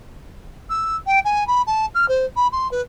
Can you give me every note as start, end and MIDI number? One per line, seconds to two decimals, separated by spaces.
0.69 0.96 88
1.06 1.19 79
1.24 1.46 80
1.47 1.61 83
1.66 1.85 81
1.94 2.08 89
2.08 2.25 72
2.36 2.47 83
2.52 2.69 84
2.71 2.81 71